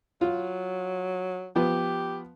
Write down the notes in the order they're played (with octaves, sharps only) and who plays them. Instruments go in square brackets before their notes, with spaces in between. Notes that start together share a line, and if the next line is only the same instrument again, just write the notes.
[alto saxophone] F#3 [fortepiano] F4
[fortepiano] F3 B3 [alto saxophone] G4